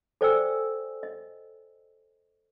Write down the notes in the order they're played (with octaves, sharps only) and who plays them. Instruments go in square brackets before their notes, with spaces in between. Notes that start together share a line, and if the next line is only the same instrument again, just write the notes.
[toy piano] A4 C5 D5 G5 G#5 E6
D#5